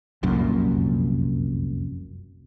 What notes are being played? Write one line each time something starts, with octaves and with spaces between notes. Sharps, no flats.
F1 C2 F#2 A#2